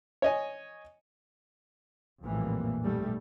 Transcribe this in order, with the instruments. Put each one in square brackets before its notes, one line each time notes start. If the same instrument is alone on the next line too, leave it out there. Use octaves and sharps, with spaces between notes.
[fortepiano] C#5 D#5 G#5
[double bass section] A#1 F2 A2 E3 G3 A#3
B1 G2 G3 A3